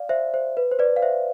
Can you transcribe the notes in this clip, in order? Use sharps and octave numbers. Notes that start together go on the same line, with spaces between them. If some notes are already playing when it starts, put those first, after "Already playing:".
Already playing: D5 F5
C5 E5
C5
B4
C5
B4 D5
F5
C5 E5